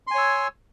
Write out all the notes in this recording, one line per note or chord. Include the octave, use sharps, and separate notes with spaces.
C#5 G#5 C6 E6